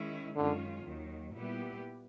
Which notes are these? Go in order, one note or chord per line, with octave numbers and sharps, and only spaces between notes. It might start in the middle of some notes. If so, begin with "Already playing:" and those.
Already playing: D#3 G#3 C#4 E4
F#2 D3 D#3 G#3 C#4 F4
D#2 D#3 F#3
A#2 G3 B3 E4 G4